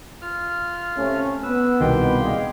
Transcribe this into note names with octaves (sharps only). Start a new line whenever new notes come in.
F4 F6
C3 A3 C#4
B3 B4 E6
C2 B2 D#3 G4 G5 C6
G2 G#3 F5